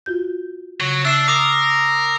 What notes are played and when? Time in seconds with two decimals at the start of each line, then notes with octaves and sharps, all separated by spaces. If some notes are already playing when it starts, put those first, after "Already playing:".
0.06 F4 F#4 G6
0.80 C#3 F#3
1.05 D4 E5 E6 C7 E7
1.28 A#4 D6 D#6 C7